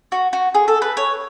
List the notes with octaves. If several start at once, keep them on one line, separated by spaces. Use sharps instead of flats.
F#4
F#4
G#4
A4
B4
C#5